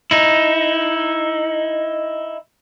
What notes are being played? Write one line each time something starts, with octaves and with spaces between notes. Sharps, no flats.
D#4 E4